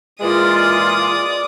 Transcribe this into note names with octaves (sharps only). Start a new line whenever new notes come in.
A#2 E3 G#3 F4 D5 D#6